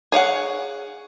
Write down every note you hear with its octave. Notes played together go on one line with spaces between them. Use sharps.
G#4 C#5 F5 F#5